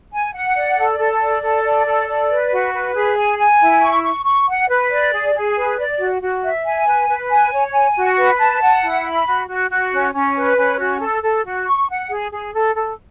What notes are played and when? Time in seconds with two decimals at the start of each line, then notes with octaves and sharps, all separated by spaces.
0.12 G#5
0.34 F#5
0.55 D5
0.77 A4
0.99 A4
1.21 D5
1.43 A4
1.64 D5
1.87 A4
2.08 D5
2.30 B4
2.52 F#4
2.73 B4
2.94 G#4
3.17 G#5
3.39 G#5
3.60 E4
3.82 C#6
4.04 C#6
4.25 C#6
4.48 F#5
4.69 B4
4.90 D5
5.13 G#4
5.35 G#4
5.57 B4
5.79 D5
6.00 F#4
6.22 F#4
6.44 E5
6.65 G#5
6.87 B4
7.09 B4
7.30 G#5
7.53 C#5
7.74 G#5
7.96 F#4
8.18 B4
8.39 A5
8.61 F#5
8.83 E4
9.05 B5
9.27 F#4
9.49 F#4
9.71 F#4
9.92 C#4
10.14 C#4
10.36 B4
10.57 C#4
10.79 F#4
11.01 A4
11.23 A4
11.45 F#4
11.67 C#6
11.89 F#5
12.10 G#4
12.32 G#4
12.54 A4
12.75 A4